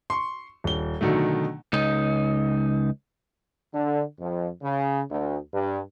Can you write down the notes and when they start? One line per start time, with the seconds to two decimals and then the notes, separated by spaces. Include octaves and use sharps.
0.10 C6 C#6
0.64 D#1 G7
1.01 B2 D3 D#3 F#3 A3
1.73 C#2 D#4
3.73 D3
4.20 F2
4.62 C#3
5.09 D2
5.53 G2